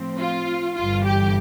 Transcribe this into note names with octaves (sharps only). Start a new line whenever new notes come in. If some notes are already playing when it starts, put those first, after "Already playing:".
Already playing: A2 F3 C4
F4
G1 G2 E3 F4
G4